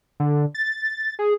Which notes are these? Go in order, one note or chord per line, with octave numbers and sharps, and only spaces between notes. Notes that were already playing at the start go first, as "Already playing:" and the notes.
D3
A6
G#4